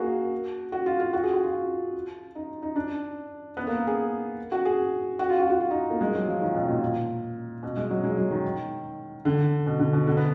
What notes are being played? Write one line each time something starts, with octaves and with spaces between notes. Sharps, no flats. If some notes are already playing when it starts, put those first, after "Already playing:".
Already playing: A#3 F#4 G#4
F#4
F4
F4
F#4
G#4
F#4
F4
D#4
D#4
D4
B3
A#3
G#4
F#4
G#4
F#4
F4
F#4
F#4
F4
D#4
A#3
G#3
F#3
F3
D#3
B2
A#2
B2
G#3
F#3
G#3
F#3
D#3
D3
B2
D3
B2
D3
B3